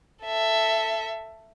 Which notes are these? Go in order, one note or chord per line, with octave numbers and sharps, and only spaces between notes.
A4 E5